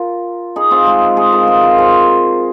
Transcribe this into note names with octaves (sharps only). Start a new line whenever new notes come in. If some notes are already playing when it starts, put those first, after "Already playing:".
Already playing: F4 A#4
D#4 G#4
C4 F4
G#3
D#4 G#4
F4 A#4
G#4 C5
F4 A#4
G#4 C5